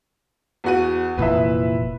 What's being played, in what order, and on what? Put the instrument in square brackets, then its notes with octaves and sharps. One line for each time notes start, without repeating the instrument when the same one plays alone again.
[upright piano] E2 F#4 D#7
[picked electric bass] F1 A#2 E3 [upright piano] B4 E5